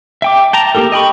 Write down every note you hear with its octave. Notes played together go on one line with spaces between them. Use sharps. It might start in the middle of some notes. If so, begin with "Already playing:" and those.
E5 G5 D6
G5 A5 A#5
A#3 D#4 G4 A4 A#4
D#5 G5 B5 C#6